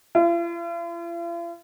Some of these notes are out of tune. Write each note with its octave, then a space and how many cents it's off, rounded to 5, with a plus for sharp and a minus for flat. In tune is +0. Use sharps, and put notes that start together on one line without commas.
F4 -45